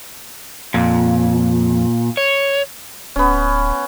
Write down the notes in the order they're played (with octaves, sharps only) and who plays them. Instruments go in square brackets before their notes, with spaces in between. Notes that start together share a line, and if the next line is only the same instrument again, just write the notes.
[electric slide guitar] F2 [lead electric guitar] A#2
[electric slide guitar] C#5
[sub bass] D1 [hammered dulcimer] B3 C#4